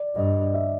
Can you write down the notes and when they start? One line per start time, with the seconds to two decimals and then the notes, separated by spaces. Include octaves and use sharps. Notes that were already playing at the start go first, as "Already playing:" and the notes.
Already playing: D5
0.15 G2 D#5
0.54 E5